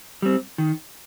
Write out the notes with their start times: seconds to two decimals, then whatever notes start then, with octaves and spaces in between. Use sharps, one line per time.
0.22 G3 C4
0.58 D#3